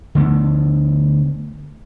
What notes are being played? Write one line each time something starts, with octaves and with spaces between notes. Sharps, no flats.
D3 A3 B3